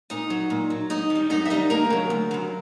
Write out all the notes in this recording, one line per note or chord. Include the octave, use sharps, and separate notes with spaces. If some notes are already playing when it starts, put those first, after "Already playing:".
A#2 D#4 D#5
F#3
A#2
F#3
F#2 D#4 D#5
D#3
G3
F#2 D#4 D#5
E5
D#3 G3 D#4 D#5
D2 A#3 A#4
C#3 F#3
D2
C#3 F#3